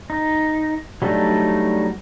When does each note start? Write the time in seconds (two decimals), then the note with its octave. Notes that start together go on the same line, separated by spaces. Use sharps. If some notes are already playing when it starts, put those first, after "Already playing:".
0.10 D#4
1.02 F#3 G3 A3 D4 D#4